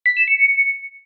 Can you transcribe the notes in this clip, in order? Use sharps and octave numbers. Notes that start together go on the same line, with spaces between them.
B6
E7
C#7